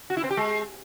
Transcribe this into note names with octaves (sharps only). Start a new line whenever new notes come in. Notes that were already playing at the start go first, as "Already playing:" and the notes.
F#4
E4
C4
G4
G#3